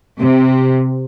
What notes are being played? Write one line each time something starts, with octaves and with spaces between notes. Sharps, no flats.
C3